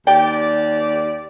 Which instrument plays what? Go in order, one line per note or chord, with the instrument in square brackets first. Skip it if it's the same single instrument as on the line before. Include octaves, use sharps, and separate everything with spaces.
[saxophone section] D#2 G4 D5 [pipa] G5